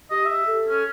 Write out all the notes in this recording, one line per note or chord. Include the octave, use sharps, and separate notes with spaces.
G4 D#5
E5
A4
C#4